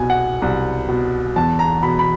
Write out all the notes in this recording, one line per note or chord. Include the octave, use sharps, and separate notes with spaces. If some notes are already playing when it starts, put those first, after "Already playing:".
Already playing: C2 B2 G#5
F#5
C2
B2
E2 A5
A#5
B2 B5
B5